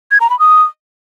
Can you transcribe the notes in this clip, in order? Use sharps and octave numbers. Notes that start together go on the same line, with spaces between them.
G#6
A#5
B5
D#6